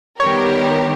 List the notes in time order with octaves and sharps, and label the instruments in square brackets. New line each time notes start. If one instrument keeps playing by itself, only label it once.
[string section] D#3 G3 B3 G4 A#4 [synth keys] C#5